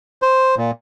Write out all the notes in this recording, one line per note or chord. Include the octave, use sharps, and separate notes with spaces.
C5
A#2